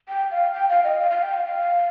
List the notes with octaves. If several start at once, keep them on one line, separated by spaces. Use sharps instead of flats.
G5
F5
G5
F5
D#5
F5
F5
G5
F5
F5